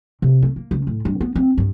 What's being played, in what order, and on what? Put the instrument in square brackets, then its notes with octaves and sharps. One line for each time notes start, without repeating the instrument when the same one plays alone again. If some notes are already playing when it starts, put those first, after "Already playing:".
[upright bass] C3
A3
A#3
C#2
A2
G2
B3
C4
G2